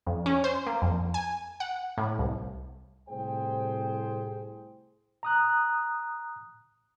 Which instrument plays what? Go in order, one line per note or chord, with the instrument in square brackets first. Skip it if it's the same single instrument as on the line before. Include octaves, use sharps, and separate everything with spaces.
[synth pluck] F2
C#4
C5
A#3
F2
G#5
F#5
A2
C2
[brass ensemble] C2 A2 C3 G#4 C5 G5
[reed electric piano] A#5 D#6 F#6